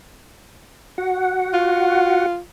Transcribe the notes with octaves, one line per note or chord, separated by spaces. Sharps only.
F#4 F#5
F4